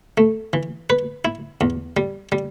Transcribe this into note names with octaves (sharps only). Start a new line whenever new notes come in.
A3
E3
B4
E4
E2
G3
G3